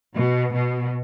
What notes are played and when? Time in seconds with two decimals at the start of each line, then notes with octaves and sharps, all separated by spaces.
0.15 B2
0.52 B2